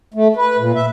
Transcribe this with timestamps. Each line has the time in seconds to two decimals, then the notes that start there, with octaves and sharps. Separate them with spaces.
0.14 A3
0.36 B4
0.59 A#2
0.75 E5